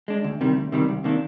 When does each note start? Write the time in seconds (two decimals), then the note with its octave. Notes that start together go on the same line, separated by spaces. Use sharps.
0.08 G#3 D4
0.24 D2
0.41 C3 D#3 G3
0.57 D2
0.72 C3 D#3 G3
0.89 C2
1.04 C3 D#3 A#3 D4